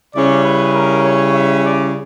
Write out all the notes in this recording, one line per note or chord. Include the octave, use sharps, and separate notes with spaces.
C#3 G3 C#4 E4 D5
B4
A#4
C#5
E5
D5